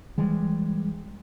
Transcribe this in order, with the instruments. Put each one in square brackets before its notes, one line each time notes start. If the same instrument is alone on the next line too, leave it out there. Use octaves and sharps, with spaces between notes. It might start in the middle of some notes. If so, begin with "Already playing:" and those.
[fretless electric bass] E3 G3 G#3